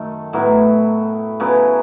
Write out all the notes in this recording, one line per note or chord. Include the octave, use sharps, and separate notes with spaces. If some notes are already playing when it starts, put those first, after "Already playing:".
Already playing: F#2 D#3 A3
A2 F#3 B3 E4
C#3 F#3 B3 E4